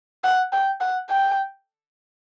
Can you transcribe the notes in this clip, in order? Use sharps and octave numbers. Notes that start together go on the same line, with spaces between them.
F#5
G5
F#5
G5